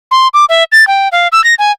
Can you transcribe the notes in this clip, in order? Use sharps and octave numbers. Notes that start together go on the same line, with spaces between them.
C6
D6
E5
A6
G5
F5
E6
A#6
G#5